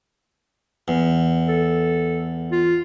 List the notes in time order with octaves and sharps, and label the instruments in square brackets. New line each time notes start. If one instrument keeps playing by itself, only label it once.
[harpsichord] E2
[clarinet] A4
F4